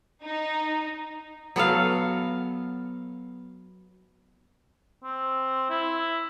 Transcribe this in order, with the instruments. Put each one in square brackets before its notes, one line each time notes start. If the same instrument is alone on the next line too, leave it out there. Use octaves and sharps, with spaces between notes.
[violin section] D#4
[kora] F#3 B3 A4 F5
[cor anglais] C4
E4